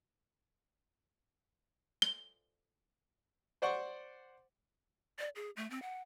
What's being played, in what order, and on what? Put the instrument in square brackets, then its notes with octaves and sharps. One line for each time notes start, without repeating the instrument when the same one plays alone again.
[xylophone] G7
[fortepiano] C5 D5 F#5 C#6
[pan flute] D5
G#4
A3
C4
F#5